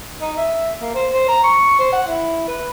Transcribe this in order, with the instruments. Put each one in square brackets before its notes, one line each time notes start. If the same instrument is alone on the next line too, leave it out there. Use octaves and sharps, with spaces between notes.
[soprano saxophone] D#4
E5
A#3
C5
C5
A#5
C#6
C5
F#5
E4
B4